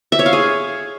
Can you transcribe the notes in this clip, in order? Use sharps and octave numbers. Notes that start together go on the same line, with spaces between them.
E5
C#5
F5
G#4